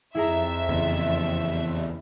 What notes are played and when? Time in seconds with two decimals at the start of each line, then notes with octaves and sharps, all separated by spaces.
0.15 F2 E4 G#4 E5 A#5
0.69 E2 C#3